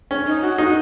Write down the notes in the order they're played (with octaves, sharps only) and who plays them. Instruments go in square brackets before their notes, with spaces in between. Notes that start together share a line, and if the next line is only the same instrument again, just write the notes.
[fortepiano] C#4
[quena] D#4
F#4
[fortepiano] D#4 [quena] F#4